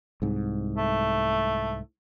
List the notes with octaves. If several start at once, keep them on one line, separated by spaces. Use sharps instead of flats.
C2 G#2
A3